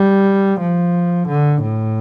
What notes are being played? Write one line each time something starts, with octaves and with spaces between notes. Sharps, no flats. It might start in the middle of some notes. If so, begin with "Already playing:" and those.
Already playing: G3
F3
D3
A2